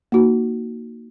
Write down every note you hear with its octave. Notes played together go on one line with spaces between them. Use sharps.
A#3 D#4 F#4